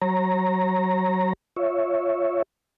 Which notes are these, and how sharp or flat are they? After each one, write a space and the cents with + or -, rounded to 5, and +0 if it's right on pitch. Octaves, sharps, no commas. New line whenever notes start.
F#3 +20 C#5 -30 A#5 -5
F4 +0 C#5 +0 E5 +0